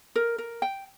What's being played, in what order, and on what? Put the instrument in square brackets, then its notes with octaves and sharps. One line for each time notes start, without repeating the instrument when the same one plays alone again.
[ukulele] A#4
A#4
G5